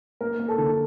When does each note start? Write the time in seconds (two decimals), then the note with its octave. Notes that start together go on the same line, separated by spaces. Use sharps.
0.21 A#3 A#4
0.39 A#3
0.48 A4
0.58 D3